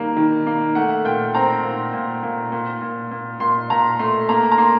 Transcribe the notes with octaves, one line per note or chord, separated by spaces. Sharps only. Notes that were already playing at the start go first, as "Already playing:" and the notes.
Already playing: D#3 G3 A#3
D#3
A#3
A3 F#5
A#2 G5
C4 A#5
A#2
A#2
A#2
A#2
A#2
A#2
A#2 C6
A#2 A#5
A3 C6
A#3 A#5
A#5
A#3 C6